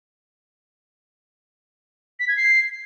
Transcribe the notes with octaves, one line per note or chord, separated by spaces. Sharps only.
B6
G#6
C7